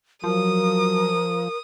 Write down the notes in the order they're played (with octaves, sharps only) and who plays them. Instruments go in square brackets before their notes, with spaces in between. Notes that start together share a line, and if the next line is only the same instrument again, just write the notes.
[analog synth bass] F3 [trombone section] F#3 [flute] A#4 [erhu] D#6